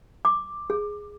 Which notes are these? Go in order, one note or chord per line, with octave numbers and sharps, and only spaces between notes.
D6
G#4